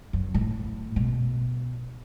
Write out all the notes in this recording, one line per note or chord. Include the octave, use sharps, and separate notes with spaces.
F#2
A2
B2